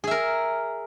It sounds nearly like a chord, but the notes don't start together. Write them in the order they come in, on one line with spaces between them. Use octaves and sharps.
G#4 E5 A#4